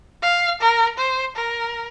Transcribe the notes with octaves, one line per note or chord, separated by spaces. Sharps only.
F5
A#4
C5
A#4